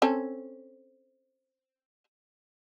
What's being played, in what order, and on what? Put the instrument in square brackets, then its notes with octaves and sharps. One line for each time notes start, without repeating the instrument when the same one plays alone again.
[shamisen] C4 C#4 A4